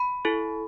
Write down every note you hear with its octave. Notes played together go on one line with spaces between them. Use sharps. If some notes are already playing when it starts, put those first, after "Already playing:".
Already playing: B5
E4 A4